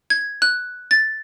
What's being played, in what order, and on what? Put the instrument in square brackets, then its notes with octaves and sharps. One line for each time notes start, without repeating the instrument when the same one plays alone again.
[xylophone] G#6
F#6
A6